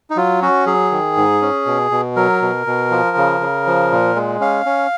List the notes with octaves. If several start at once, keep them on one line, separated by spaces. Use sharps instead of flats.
D#4
F#3 F4
C#4 F#4
F#3 G#4
D#3
G#2
C#4
B2
B2
F#3 A#4
B2
B2
F3
C#3
C#3
F3
A#2
G#3
C#4 F5
C#4